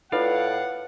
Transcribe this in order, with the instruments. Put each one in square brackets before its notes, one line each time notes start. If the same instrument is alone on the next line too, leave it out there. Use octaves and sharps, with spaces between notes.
[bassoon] A2 [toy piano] F4 A4 B4 [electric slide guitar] D5 F5 [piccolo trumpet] F#5